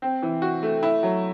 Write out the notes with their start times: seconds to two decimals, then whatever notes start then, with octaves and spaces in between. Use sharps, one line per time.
0.02 C4
0.23 E3
0.42 F#4
0.63 A3
0.83 E4
1.03 F#3